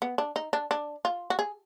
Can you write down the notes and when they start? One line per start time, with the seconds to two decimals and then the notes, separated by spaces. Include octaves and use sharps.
0.02 B3
0.18 D4
0.36 D#4
0.53 D4
0.71 D4
1.05 F4
1.30 F#4
1.39 G#4